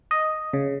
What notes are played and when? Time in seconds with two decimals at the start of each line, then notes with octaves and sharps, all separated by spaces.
0.11 D#5
0.53 C#3